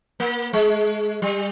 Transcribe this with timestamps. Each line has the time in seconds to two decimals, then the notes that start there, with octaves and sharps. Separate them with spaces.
0.20 A#3
0.53 G#3
1.22 G3